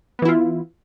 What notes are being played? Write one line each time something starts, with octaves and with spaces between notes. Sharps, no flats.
E3 B3 E4 F4